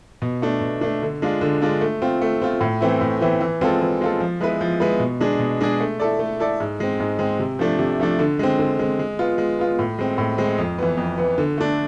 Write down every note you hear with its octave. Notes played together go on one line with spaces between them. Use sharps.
B2
A3 D4
B2
A3 D4
D3
G#3 D4 F4
D3
G#3 D4 F4
A3
C4 F4
A3
C4 F4
A2
E3 A3 C4 E4
A2
E3 A3 C4 E4
E3
G#3 C4 F4 A4
E3
G#3 C4 F4 A4
F3
G#3 B3 E4 B4
F3
G#3 B3 E4 B4
B2
G#3 D4 G#4
B2
G#3 D4 G#4
A3
E4 A4 D5
A3
E4 A4 D5
G#2
G#3 C4
G#2
G#3 C4
C3
F3 A3 D4
C3
F3 A3 D4
D3
G#3 C4
D3
G#3 C4
G#3
B3 F4
G#3
B3 F4
A2
G#3 C4
A2
G#3 C4
F2
E3 B3
F2
E3 B3
D3
A3 D4